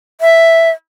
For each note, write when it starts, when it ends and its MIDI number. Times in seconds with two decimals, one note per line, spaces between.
0.21 0.70 76